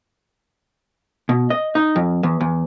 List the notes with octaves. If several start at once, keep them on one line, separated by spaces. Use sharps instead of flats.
B2
D#5
D#4
F2
E2
E2